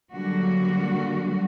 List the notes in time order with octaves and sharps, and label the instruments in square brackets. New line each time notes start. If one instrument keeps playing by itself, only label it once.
[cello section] D3 F#3 G3 A#3 F#4